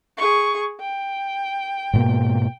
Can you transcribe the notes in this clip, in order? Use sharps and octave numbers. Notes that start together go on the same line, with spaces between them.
G#4 C#6
G5
G#2 B2 A#3